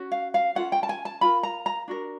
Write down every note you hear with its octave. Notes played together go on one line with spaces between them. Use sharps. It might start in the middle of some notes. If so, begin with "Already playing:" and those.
Already playing: C#4 F#4
F5
F5
C#4 F4 A4 F#5
G5
A5
G#5
A5
F4 A#4 B5
A#5
A#5
D4 F#4 A#4